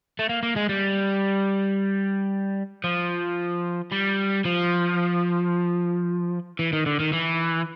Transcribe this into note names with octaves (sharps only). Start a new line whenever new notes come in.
A3
A#3
A#3
G#3
G3
F3
G3
F3
E3
D#3
D3
D#3
E3